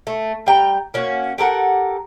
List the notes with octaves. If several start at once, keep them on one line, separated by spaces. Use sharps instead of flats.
A3
G3 G5 A#5
A#3 C#4 F#4
G4 A4 A#4 F#5